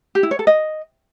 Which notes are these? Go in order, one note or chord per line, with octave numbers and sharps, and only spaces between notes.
G4
E4
C#5
A4
D#5